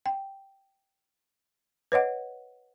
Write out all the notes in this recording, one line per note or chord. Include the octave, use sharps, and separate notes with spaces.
G5
B4 C#5 D#5 F#5